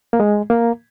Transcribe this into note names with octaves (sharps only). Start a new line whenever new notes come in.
A#3
G#3
A#3